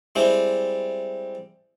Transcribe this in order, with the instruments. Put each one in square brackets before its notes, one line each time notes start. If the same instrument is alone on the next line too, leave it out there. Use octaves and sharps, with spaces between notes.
[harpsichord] G3 G#3 C4 E4